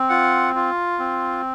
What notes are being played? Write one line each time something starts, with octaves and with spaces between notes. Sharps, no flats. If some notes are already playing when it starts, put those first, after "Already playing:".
Already playing: C4
F4 F#5
F4
C4